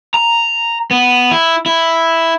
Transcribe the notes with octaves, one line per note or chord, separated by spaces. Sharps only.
A#5
B3
E4
E4